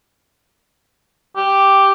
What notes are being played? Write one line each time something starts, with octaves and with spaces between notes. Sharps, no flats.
G4